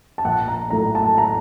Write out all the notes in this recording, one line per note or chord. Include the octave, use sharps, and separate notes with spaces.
A5
A#1 F#5
A#5
A2 F#3 A3 A#5
A5
A#5